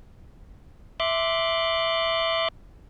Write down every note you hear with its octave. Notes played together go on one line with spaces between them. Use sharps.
E5 C6 D6 F#6